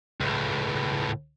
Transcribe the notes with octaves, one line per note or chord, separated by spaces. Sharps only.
C#2 A2